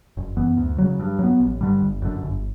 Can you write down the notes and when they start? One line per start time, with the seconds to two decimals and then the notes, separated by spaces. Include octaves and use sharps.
0.17 F#1
0.37 F#2 E3 B3
0.57 D2
0.78 C#3 F#3
0.99 G2
1.19 F#3 B3
1.40 A1
1.61 G2 D3 G3
1.81 G1
2.02 F#2 D3
2.22 G1